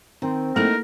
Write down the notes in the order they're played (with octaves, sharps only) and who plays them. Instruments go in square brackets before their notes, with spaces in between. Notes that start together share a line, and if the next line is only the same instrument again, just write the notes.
[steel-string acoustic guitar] D#3 [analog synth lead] C4
[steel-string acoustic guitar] A3 D#4 [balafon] A#3 E4 A4 [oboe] A#4